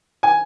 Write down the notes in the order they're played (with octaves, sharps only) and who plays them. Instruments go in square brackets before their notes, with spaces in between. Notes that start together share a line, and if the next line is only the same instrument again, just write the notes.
[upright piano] G#5